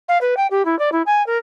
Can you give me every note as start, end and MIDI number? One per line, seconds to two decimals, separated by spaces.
0.08 0.18 77
0.21 0.34 71
0.37 0.47 79
0.50 0.65 67
0.65 0.78 64
0.79 0.89 74
0.92 1.02 64
1.06 1.25 80
1.26 1.37 70